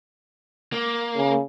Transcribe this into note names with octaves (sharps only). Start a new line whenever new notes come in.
A#3
C#3